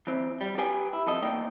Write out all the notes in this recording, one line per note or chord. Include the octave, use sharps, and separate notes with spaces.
E3 C4
G3
G4 B4 G5 G#5
E4
F2 A4 D#5
E2 A#3 D#4 D5 G5